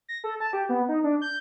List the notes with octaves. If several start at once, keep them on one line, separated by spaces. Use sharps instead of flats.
A#6
A4
A5
G4
B3
D#4
D4
G6